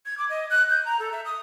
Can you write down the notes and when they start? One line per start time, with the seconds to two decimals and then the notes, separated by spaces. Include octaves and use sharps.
0.06 G#6
0.18 D6
0.29 D#5
0.50 F#6
0.70 G6
0.85 A#5
0.99 A4
1.12 E5
1.25 D#6